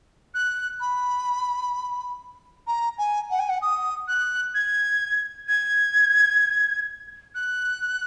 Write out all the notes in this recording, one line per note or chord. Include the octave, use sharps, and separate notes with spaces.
F#6
B5
A#5
G#5
F#5
G#5
F#5
D#6
F#6
G#6
G#6
F#6